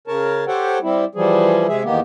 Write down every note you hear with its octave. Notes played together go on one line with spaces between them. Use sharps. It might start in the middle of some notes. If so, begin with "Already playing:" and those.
C#3 A#4 C#5 A5
G4 A4 C5 C#5 F#5 G5
G3 C4 E4
E3 F3 G3 G#4
C3 G#3 G#4 E5
E2 D#3 A#3 B3 G4